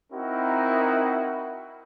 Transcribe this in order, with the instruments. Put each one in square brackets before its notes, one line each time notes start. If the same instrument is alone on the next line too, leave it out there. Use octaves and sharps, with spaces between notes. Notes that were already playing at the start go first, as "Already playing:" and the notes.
[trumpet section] C4 D#4 E4 F#4 A#4